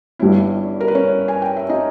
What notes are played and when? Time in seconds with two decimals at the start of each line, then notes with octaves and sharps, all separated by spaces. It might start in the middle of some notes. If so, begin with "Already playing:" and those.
0.19 G1 G2 G3 C#4 E4
0.80 A#4
0.88 B4
0.95 C#4 C#5
1.28 G#5
1.42 G5
1.56 E5
1.69 D#4 D#5